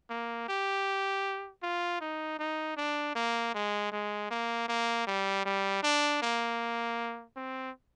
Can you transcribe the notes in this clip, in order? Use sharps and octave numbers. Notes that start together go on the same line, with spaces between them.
A#3
G4
F4
D#4
D#4
D4
A#3
G#3
G#3
A#3
A#3
G3
G3
D4
A#3
C4